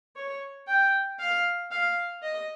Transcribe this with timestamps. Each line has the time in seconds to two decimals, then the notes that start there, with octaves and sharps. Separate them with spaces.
0.16 C#5
0.67 G5
1.19 F5
1.71 F5
2.22 D#5